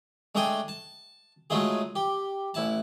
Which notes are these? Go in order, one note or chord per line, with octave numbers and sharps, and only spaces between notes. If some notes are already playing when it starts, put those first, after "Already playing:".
G#3 A3 D4 G#4 G5 G#5
A5
F#3 G#3 A3 D#4 F4 G#4
G4
A1 E4 A5